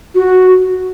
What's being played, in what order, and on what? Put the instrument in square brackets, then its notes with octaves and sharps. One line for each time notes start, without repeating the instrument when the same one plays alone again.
[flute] F#4